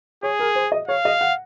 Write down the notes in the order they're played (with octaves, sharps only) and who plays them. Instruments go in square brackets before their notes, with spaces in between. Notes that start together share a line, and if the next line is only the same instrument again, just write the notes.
[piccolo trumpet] G#4 [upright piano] C#5
[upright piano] A#4
C5
D#5
[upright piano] C#5 [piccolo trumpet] F5
[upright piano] D#5
F#5